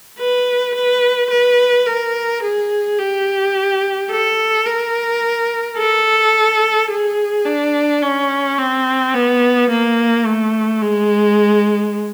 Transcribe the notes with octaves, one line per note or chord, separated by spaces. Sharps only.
B4
B4
B4
A#4
G#4
G4
A4
A#4
A4
G#4
D4
C#4
C4
B3
A#3
A3
G#3